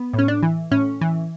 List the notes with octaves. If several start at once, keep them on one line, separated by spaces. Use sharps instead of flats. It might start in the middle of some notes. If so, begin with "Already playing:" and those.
Already playing: B3
A2 C#4
D4
E3
A2 C#4
E3